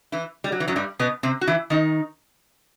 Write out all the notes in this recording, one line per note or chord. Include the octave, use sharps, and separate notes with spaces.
E3 E4
G3
F#3
E3
F#2 F#3
G2 G3
B2 B3
C3 C4
F#4
E3 E4
D#3 D#4